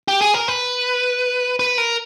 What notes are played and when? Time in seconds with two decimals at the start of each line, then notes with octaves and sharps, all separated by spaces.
0.08 G4
0.21 G#4
0.34 A#4
0.48 B4
1.59 B4
1.78 A#4